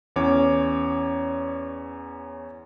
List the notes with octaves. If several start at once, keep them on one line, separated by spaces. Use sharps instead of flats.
E2 C#4 C#5 D6